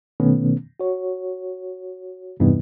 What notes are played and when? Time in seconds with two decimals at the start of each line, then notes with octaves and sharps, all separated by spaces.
0.20 B2 D#3 A3 B3 C#4
0.80 F#4 C#5
2.40 E2 G2 C3 E3 B3 D#4